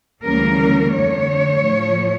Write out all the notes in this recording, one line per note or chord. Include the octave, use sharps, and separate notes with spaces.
D2 C#3 E3 G3 A#3 A#4
F2 D3 A3 C#5
A2 F3 A3